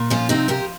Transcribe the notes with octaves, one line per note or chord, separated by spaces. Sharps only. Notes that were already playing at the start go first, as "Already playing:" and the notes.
Already playing: A#2
F3 C#4 F4
C3 C4 D#4
F3 G4 A#4